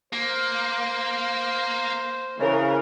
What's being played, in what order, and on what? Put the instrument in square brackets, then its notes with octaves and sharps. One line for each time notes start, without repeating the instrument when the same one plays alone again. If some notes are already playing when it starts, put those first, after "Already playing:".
[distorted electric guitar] A#3 [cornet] C5
[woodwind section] C#3 [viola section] E3 A#4